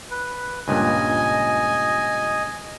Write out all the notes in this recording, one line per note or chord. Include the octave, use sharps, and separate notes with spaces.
B4
C#2 G2 A#2 D#5 G#5